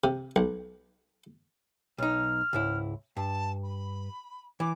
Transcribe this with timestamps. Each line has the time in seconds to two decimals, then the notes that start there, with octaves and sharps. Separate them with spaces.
0.04 C3
0.36 B1
1.98 B1 D#4 F6
2.53 C#2 G#2 E4
3.17 G2 A5
3.63 B5
4.60 E3 D6